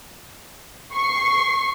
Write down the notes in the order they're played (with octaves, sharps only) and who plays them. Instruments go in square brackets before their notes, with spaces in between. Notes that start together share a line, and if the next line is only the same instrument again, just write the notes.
[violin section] C#6 C7